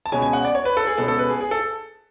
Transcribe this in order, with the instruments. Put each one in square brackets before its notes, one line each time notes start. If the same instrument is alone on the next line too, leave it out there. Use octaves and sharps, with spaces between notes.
[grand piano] A5
B2 G#3 C#4 G#5
G#5
F#5
D5
C#5
B4
A4
G#4
B2 G#3 C#4 A4
A4
B4
G#4
G#4
A4